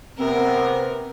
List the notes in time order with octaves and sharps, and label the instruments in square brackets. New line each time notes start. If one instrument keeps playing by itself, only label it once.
[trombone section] C3 B3 [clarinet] C4 [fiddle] A#4